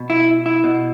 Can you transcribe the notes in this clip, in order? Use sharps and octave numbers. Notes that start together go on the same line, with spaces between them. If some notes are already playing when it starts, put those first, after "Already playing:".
Already playing: B2
E4
E4
B2